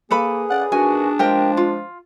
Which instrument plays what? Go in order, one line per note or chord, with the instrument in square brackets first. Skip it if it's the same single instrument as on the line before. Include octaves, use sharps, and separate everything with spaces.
[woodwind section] A#3 [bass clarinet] G#4 [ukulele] A4 B4 B5
[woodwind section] C#3 D5 [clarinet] F#5
[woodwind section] D#3 E3 F#4 [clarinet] D4 [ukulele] G#5
[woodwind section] F3 G#3 [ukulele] G4 A#4 G5
[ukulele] F4